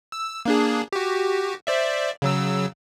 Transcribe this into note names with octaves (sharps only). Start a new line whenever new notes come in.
E6
A#3 D4 G#4
F#4 G4
C5 D5 E5
C#3 F#3 E6